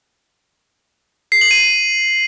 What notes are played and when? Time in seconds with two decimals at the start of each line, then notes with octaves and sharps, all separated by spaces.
1.32 C7
1.41 F#7
1.51 D#7